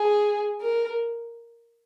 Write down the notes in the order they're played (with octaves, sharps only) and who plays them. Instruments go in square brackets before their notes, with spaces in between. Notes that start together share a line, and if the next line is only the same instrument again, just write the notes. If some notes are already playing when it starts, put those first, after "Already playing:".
Already playing: [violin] G#4
A#4